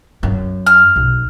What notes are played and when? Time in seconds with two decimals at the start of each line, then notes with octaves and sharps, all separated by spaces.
0.23 F#2
0.67 F6
0.96 B1